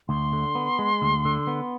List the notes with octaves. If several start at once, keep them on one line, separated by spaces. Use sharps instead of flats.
D2 C6
D3
B3
G#3
D2
D3
B3